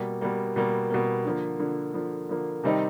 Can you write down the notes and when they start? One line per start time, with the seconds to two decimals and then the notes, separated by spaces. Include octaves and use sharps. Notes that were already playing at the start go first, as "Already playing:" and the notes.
Already playing: B2 G3 A#3
0.21 B2 G3 A#3
0.56 B2 G3 A#3
0.90 B2 G3 A#3
1.25 D3 F3 A#3
1.60 D3 F3 A#3
1.94 D3 F3 A#3
2.29 D3 F3 A#3
2.64 C3 D#3 G3 C4 D#4